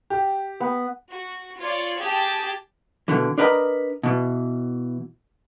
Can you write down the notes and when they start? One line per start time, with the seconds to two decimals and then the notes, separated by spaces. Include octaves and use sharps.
0.10 G4
0.60 B3
1.11 F#4
1.60 F4 C#5 D5
2.00 G4 G#4 G5 A5
3.08 B2 D3 E3
3.38 D4 A#4 B4 D#5 G#5 A#5
4.03 B2 E3